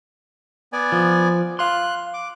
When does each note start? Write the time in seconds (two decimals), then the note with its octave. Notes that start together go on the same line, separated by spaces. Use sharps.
0.73 B3 D5 G#5
0.92 F3
1.59 F5 C6 F#6
2.14 D6